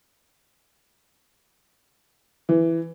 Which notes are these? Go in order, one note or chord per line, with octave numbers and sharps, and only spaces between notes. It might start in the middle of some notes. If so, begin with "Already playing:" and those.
E3